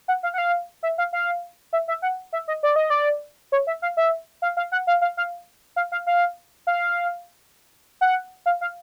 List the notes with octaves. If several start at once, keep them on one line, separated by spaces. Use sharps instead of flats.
F#5
F5
F#5
F5
E5
F5
F5
E5
E5
F#5
E5
D#5
D5
D#5
D5
C#5
E5
F5
E5
F5
F5
F#5
F5
F5
F5
F5
F5
F5
F5
F#5
F5
F5